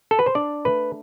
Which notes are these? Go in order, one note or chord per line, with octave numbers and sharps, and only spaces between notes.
A4
B4
C5
D4 D5
A3 B4